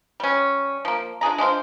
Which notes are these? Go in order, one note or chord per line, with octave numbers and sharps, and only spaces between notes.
G3 C#4
F3 A#3
D4 F4 G#4 A#5
G#3 D4 F4 C5